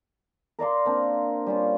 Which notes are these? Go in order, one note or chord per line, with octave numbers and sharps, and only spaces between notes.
A#4 D5 F5 C6
A#3 C4 D4
G3 C#4 F4